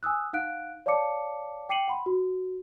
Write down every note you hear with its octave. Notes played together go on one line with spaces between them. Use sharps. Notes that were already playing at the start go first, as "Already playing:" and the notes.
G#5 D#6 E6 F#6
D#4 F5 F#5 F#6 D7
C#5 D5 F5 A5 D6 C#7
G5 D6 C7 C#7 D#7 F#7
F#5 B5 C6
F#4